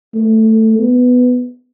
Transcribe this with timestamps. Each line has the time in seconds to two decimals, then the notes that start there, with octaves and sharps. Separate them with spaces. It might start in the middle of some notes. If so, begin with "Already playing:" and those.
0.15 A3
0.79 B3